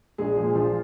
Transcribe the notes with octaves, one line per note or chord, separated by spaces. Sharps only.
A#1 G#3 G#4
A#2 F3
A#1 F3 F4